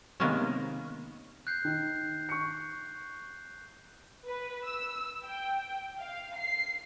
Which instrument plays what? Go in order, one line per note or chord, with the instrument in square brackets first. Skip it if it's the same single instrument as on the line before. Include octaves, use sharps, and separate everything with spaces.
[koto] C3 D#3 G#3 A#3 B3 C#4
[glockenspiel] F#6 G6 C7
[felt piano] D#3
C#6 C#7
[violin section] B4
E6
G5
F5
C7